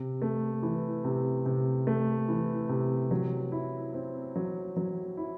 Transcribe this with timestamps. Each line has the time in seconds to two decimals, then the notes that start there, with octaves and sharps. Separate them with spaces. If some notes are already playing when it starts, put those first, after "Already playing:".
Already playing: C3
0.22 A3
0.63 E3
1.05 C3
1.46 C3
1.87 A3
2.28 E3
2.69 C3
3.11 F#3
3.52 E4
3.94 C4
4.36 F#3
4.76 F#3
5.17 E4